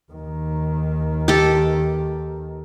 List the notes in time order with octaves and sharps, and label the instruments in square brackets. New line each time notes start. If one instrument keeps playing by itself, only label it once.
[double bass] D#2 D#3
[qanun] G4 A4